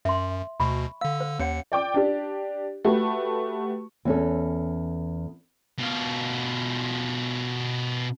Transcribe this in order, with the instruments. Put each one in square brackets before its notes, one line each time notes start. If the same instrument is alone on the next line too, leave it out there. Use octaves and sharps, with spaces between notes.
[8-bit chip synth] F#2 [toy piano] E5 C6
[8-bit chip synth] D2 B2 [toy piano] B5 C#6
[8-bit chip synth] D3 E6 [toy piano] F5
[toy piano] C5
[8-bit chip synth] D#2 C#7 [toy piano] C#4 C#5 F#5
[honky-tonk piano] D5 G5 D6
D4 G4
A3 F#4 G4 B4
[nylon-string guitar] E2 C#4 A4
[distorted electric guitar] B2 F4